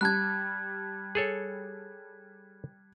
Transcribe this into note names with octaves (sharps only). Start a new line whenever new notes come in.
G3 A5 F#6 G#6
G#4 A4 C#5